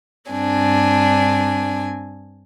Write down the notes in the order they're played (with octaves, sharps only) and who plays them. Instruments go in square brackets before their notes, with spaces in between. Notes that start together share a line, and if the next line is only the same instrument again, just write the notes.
[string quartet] G2 C4 D4 G#5